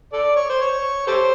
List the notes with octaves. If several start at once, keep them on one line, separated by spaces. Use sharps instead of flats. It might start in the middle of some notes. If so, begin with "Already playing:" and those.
A4 D5
C#5
C5
C#5
G4 A4 C5